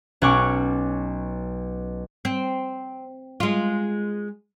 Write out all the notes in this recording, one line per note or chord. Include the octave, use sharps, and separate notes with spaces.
B1 C#4 F#5 C#6 D6
C4
G#3 F4